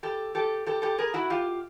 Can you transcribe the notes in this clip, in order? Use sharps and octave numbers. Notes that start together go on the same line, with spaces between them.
G4 A4
G4 A4
G4 A4
G4 A4
G#4 A#4
E4 F#4
F4 G4